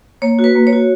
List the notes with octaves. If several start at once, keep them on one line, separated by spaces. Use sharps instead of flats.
A#3 C#5
F#4
B4
A#3
C#5
F#4